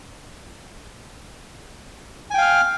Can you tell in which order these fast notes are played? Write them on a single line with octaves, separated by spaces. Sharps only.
G#5 G5 F5 F6